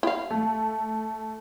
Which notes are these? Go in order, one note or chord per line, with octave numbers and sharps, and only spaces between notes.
E4 F5
A3